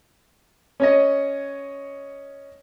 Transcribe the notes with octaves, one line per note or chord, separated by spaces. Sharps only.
C#4 C#5 D#5